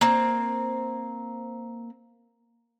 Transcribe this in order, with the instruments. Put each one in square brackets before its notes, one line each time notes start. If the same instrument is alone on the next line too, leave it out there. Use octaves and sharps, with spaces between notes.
[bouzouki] A#3 C4